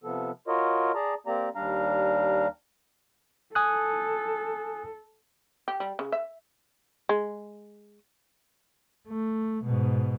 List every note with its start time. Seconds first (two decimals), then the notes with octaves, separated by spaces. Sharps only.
0.04 C3 F3 B3 A4
0.48 F4 F#4 A#4 C#5 D#5
0.95 G#4 D5 A5 A#5
1.27 A#3 C4 G4 D5 A#5
1.55 D#2 G3 D4 F5 A#5
3.55 A4 G#5 D#6 F#6
5.68 G4
5.80 G3
5.99 C#3
6.12 E5
7.09 G#3
9.08 A3
9.65 G#2 B2